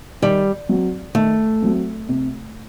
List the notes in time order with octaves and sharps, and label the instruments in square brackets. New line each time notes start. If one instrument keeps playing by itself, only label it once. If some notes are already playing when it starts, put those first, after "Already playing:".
[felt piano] D#3 [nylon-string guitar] G3
[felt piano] F#3 C4
[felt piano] D#3 [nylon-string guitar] A3
[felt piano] F#3 C4
C3